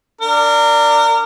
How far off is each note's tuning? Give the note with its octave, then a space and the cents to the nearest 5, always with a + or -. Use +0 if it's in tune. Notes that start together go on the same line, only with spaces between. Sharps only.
D4 +0 A#4 -25